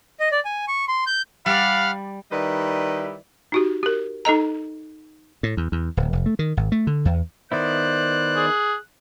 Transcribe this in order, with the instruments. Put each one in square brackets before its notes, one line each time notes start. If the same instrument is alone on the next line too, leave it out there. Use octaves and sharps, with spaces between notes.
[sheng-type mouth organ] D#5
D5
G#5
C#6
C6
G6
[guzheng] G3 D5 [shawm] F5 [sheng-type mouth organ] F#5 B5 F6
[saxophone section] D#3 G3 E4 B4 D5 D#5
[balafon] D#4 F#4 G4
G4 A#4
D#4 A4 D#5 A#5
[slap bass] A2
E2
E2
D1
F1
A3
D#3
G#1
A3
D3
E2
[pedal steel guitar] D#3 B3 E4 [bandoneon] C5 D5 [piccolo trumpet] F#6
[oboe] G#4